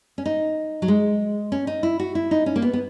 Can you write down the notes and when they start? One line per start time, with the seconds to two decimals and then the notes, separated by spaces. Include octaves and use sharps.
0.18 C#4
0.26 D#4
0.82 F#3
0.88 G#3
1.52 C#4
1.67 D#4
1.83 E4
2.00 F#4
2.15 E4
2.31 D#4
2.46 C#4
2.56 A#3
2.62 B3
2.73 B3